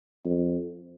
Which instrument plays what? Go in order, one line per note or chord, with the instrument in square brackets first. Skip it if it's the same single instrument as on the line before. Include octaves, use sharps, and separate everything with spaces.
[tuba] F2